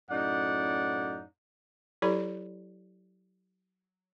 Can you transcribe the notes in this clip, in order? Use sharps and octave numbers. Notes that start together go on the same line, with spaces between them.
F#2 A2 D#4 D5 F#5
F#3 E4 G4 A4 D5 B5